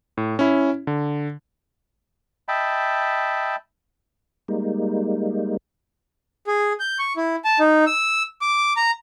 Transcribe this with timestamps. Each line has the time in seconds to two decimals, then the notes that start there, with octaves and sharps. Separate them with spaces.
0.17 A2
0.39 C#4 E4
0.87 D3
2.48 D#5 E5 G5 A5 B5
4.48 G3 G#3 A#3 D#4
6.47 G#4
6.80 G6
6.99 C#6
7.17 E4
7.45 A5
7.60 D#4
7.87 E6
8.41 D6
8.77 A#5